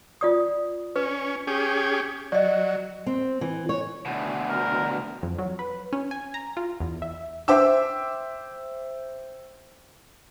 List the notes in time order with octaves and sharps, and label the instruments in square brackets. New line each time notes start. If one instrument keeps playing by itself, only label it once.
[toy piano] F4 D5 D#6
[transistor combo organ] C#4 [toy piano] B4
[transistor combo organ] C#4 G4 G#4
[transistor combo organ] F#3 [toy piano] D5 D#5
[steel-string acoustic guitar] C4
E3
C#5
[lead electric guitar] D2 B2
[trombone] A#4
[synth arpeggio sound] F2
F#3
B4
C#4
G#5
A#5
F4
E2
E5
[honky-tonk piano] C5 E5 G5 D6 E6